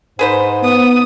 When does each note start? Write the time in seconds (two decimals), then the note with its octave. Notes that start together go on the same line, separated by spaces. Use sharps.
0.19 G#2 G#4 B4 C5
0.63 B3 D#6